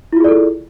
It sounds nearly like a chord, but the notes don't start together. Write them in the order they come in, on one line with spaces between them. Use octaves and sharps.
E4 F4 G#4 D5 A4